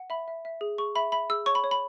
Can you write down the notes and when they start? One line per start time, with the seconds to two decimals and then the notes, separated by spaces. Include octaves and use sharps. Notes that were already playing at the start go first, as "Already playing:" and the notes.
Already playing: F#5
0.10 E5 B5
0.28 E5
0.45 E5
0.61 G#4
0.78 G#4 C#6
0.95 E5 B5
1.12 E5 B5
1.30 G#4 E6
1.46 C#5 C#6
1.55 B5
1.64 C#5
1.71 B5